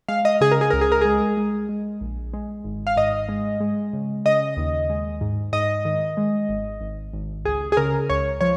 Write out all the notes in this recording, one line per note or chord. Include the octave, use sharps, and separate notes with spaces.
G#3 F5
D#5
C#3 G#4
A#4
G#4
C#2 A#4
G#4
A#4
G#3 G#4
G#3
G#3
A#1
G#3
G#1
F5
G#2 D#5
G#3
G#3
C#3
C#3 D#5
D#2
G#3
G#2
G#2 D#5
D#3
G#3
G#1
G#1
G#1
C#2 G#4
G#4
C#3 A#4
C#2 C#5
F3 C#5